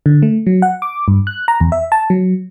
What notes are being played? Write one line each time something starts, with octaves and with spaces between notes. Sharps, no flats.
D3
A3
F#3
F#5
D6
G2
F#6
A#5
E2
E5
A5
F#3